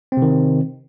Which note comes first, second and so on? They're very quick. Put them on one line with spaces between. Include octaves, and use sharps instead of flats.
C4 C3 D#3